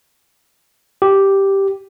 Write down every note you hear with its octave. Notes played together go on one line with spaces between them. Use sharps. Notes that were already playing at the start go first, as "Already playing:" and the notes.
G4